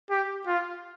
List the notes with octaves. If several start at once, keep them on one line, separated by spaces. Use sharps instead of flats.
G4
F4